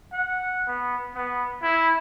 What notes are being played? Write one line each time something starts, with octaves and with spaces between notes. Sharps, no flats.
F#5
B3
B3
E4